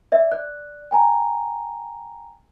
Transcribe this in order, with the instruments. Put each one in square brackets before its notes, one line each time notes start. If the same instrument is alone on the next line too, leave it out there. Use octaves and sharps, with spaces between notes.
[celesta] D5 E5
D5 F#6
G5 G#5 A#5